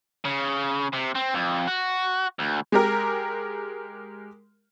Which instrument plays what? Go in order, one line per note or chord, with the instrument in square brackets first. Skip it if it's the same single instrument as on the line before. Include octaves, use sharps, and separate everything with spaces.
[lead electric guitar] C#3
C3
C4
F2
F#4
D2
[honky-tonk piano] G#3 G4 A#4